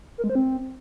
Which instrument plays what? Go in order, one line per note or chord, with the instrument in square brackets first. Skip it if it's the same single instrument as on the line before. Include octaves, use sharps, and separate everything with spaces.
[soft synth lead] A#4
G#3
C5
C4